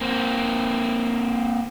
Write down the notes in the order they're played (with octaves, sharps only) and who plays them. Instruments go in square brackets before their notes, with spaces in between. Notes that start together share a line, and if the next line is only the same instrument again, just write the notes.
[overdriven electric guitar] A#3 C4